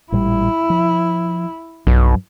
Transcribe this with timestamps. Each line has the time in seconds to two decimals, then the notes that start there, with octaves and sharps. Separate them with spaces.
0.12 A1 A#2 G3 E4
0.70 F3
1.87 B1 G2 F#3